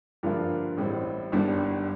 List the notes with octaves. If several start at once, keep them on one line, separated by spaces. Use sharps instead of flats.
G2 D3 F3 A#3 F4
A1 A2 G3 C4
G1 G2 D#3 G3 D4